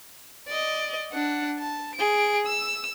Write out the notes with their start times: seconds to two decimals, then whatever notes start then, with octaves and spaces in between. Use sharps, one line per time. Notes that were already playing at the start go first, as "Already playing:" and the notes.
0.48 D5 D#5
1.12 D4 F#5
1.59 A5
1.95 G#4 D7
2.46 E6